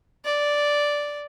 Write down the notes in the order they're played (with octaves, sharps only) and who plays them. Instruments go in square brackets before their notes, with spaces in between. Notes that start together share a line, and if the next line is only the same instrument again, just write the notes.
[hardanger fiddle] D5